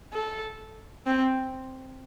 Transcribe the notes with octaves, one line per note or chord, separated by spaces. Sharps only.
A4
C4